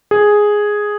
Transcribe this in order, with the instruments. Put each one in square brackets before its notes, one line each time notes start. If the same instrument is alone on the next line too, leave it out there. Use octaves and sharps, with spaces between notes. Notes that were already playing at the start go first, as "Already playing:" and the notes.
[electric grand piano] G#4